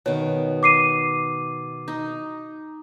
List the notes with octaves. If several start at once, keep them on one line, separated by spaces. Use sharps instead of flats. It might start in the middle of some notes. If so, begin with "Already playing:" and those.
B2 D#3 C#5
D6 C7 D#7
D#4